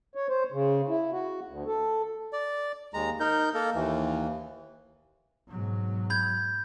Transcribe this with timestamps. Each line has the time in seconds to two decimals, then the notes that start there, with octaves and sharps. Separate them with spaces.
0.15 C#5
0.28 C5
0.52 C#3
0.89 E4
1.12 F#4
1.48 D2
1.67 A4
2.33 D5
2.94 D#2 G#3 A#5
3.20 D#4 A#4 G6
3.54 A#3 A4 A#4
3.74 D#2 E3
5.49 G#2 B2 F#3
6.10 B5 G6 G#6